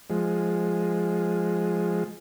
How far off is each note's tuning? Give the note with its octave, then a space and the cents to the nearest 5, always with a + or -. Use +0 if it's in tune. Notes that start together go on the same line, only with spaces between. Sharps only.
F3 +0 G#3 +0